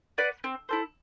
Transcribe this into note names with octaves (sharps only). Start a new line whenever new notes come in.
B4 D5 F#5
C4
E4 A4 C5